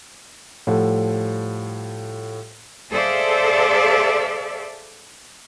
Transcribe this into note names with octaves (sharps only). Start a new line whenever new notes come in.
A2 F3 G3 A4 F#5
G#4 A4 C5 D5 E5 F5